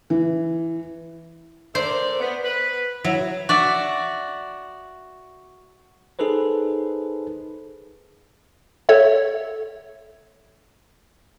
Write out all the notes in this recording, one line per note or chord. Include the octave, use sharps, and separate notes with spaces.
E3
A3 A#4 C5 D5
B3
B4
F#3 E4
F#4 D5 E5
D#4 G#4 A4 B4 C5
A4 C#5 E5